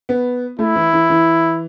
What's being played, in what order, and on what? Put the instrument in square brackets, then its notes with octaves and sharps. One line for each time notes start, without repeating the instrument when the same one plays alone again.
[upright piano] B3
[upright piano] A3 [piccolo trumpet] E4
[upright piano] E3
E3
E3